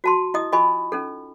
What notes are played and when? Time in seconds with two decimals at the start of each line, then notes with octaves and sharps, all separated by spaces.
0.04 F#4 A5 C6
0.34 E4 D#5 D#6
0.52 F4 D#5 G#5 B5 C#6
0.92 C#4 D#4 A4